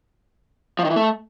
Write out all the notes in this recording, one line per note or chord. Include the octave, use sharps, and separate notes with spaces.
F3
D#3
E3
A3